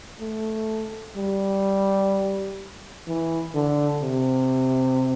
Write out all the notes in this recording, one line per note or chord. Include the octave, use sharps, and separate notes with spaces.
A3
G3
E3
D3
C3